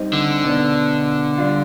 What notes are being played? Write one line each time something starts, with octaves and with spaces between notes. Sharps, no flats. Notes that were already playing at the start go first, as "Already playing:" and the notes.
Already playing: G3 C4 D#4
D3
B2 B3 D4
G3 D4 F4